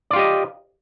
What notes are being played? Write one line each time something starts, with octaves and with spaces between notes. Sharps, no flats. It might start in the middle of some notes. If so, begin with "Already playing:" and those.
F4 G4 D5 D#5